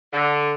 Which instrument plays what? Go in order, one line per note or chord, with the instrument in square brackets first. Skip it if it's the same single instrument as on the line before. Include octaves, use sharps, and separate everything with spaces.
[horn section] D3